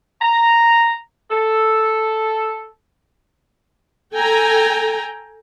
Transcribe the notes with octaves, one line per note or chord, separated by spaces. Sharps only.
A#5
A4
A4 G5 G#5 A#5